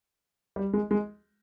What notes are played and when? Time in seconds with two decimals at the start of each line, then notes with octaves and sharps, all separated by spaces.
0.56 G3
0.73 G#3
0.91 G#3